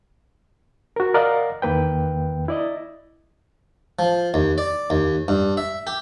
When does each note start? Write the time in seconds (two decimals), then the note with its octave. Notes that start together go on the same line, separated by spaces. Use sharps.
0.96 F#4 A#4
1.14 A#4 D5 D#5 F5 F#5
1.62 E2 D#3 A#3 B4 G5
2.48 E4 D5 D#5
3.99 F3
4.34 D#2
4.58 D5
4.90 D#2
5.28 G2
5.57 E5
5.87 G4